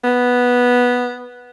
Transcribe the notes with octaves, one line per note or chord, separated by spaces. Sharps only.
B3